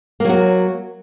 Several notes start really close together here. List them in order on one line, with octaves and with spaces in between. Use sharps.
A#3 F#3 F#4